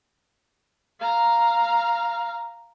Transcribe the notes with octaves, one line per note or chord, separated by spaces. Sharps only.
F5 A#5